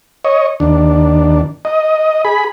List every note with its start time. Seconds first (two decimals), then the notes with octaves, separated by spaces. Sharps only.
0.25 C#5 D#5
0.60 D#2 D4
1.65 D#5
2.25 G#4 B5